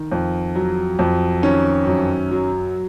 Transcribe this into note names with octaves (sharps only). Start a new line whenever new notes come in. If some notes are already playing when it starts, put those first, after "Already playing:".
Already playing: D#3
F2
F#3
F2
D#3 C#4
F#2
F#3